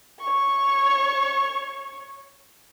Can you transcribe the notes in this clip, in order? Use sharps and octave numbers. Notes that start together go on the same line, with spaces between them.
C#5 C#6